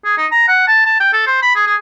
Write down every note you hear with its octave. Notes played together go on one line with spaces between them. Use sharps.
G#4
D#4
A#5
F#5
A5
A5
G5
A4
C5
B5
G#4
G#4